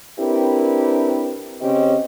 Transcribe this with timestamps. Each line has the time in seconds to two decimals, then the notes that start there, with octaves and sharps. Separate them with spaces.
0.19 C4 D4 E4 G4 A#4 B4
1.61 C#3 C4 C#4 G4 D#5